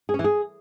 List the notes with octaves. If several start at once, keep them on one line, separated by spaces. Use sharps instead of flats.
G#4
C#4
E3
G#4